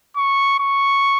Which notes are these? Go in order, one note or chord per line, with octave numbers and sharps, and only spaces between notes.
C#6
C#6